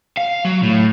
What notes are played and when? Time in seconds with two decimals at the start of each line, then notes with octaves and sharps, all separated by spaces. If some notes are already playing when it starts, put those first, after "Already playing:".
0.17 F5
0.45 F#3
0.63 A2